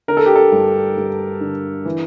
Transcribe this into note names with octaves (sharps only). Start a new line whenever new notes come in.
D3 A#4
A4
G4
A4
G2
G2
D3
E3